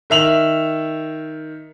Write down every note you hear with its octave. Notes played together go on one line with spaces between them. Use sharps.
D#3 E5 F7 F#7